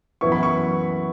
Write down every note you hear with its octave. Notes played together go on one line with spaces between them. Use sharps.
F#2 E3 B3 E4 C#6
B5
C#6